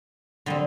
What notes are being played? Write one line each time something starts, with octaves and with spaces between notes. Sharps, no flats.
D3 G3 C4 D#5